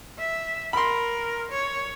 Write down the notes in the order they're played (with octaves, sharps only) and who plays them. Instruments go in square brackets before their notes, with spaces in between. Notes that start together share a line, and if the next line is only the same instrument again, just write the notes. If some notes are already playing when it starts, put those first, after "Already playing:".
[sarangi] E5
[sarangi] A#4 [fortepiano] B5 C6
[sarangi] C#5